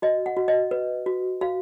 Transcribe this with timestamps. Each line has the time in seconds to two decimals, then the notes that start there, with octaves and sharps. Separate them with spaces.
0.02 F#4 D#5
0.26 F#5
0.37 F#4
0.48 D#5
0.71 B4
1.06 F#4
1.41 F#4 F5